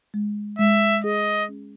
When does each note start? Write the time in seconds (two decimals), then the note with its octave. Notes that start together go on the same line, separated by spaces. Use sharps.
0.14 G#3
0.59 G#3 E5
1.04 G#4 D#5
1.49 C#4